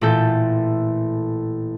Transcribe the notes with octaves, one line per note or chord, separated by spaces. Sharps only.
A1 A#2 A3 E4 A4 G6